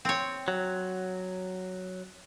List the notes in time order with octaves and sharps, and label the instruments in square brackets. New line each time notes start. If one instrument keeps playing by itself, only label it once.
[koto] C4 C#5
[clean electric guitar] F#3